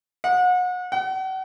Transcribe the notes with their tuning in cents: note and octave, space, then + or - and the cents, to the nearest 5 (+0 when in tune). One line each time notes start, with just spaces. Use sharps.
F#5 -35
F#5 +40